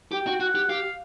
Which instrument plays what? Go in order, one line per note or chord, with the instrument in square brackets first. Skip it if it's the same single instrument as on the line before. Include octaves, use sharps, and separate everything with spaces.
[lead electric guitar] G4 [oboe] G5
[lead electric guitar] F#4
[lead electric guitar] F#4 [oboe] F#5
[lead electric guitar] G4
[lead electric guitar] G4 [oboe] F5